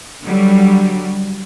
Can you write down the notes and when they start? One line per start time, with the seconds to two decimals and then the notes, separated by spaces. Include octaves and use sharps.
0.24 D3 F#3 G3